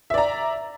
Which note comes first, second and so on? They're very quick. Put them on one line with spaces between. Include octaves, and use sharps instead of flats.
E5 D5 A#5